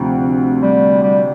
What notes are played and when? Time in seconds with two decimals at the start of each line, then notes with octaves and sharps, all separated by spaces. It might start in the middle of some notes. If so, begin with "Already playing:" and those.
Already playing: D2 C3 F3 C4
0.62 G3
1.03 G3